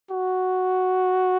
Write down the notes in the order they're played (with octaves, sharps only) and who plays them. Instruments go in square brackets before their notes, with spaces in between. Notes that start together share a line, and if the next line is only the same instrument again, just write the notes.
[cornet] F#4